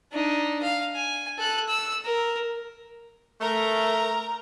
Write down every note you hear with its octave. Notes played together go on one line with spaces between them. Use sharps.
D4 D#4
F5
G#5
A4 F#6
E6
A#4
A3 A#4 A#5